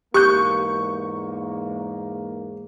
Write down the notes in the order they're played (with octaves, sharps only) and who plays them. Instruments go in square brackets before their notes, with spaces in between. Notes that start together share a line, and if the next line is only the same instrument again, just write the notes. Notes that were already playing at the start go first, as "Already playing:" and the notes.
[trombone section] E2 G#2 A#3 [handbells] G4 F#6 G6 [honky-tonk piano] C#6